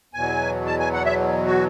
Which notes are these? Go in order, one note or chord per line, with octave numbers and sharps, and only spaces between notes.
E2 B2 F#3 G#5
A5
G#5
F#5
E5
F#4